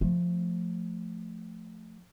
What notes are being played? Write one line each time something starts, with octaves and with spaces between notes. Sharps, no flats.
F3 A3